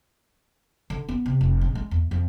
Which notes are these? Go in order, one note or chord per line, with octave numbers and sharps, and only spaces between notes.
D3
B3
C3
F1
A#1
G#3
E2
F2